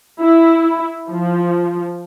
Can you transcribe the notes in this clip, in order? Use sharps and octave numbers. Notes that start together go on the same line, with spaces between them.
E4
F3